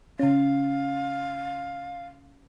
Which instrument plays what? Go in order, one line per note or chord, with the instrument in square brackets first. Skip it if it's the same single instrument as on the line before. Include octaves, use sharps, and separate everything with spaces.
[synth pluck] C#3 C#4 [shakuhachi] F5